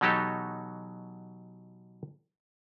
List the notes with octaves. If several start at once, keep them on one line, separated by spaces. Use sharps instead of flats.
B2 E3 F#3 D#4 G4 A4